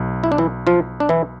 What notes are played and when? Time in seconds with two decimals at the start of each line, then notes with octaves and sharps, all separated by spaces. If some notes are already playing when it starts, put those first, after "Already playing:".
Already playing: B1
0.24 E4
0.32 D4
0.38 E3 E4
0.67 F3 F4
1.00 D4
1.09 E3 E4